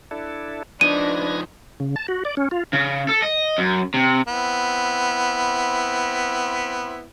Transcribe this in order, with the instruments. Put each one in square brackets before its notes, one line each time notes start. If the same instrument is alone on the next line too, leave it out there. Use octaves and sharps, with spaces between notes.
[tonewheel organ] D4 E4 A4
[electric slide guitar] F3 D#4 [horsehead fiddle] D4 [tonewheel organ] B4 G#6 A#6 [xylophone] D#7
[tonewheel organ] C#3
A5
F#4
D5
C#4
F4
[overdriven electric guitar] C#3
A4
D#5
F#2
C3
[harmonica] B3 C4 E4